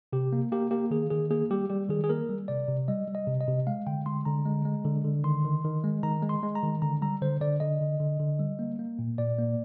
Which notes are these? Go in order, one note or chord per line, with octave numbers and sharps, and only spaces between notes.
C3 G4
A#3
A#3 G4
A#3 G4
D#3 G#4
D#3 G#4
A#3 G#4
G3 G4
G3 G4
D#3 G#4
G#4
A#3 A#4
G3
C3 D5
C3
G3 D#5
G3
D#5
C3
D#5
C3
G#3 F5
D3 G5
G#3 C6
D3 A#5
G#3
G#3
D3
D3
D#3 C6
D#3
D#3
G#3
D#3 A#5
G#3
C6
G#3
A#5
D#3
D3 A#5
G3 A#5
D3 C5
D3 D5
D3 D#5
D3
D3
D3
G3
A#3
A#3
A#2
A#2 D5
A#3